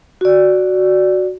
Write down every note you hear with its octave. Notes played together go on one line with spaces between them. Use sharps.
F#4 D5